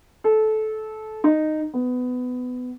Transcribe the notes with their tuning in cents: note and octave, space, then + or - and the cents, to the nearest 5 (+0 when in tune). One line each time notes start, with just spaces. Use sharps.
A4 -20
D#4 -10
B3 +20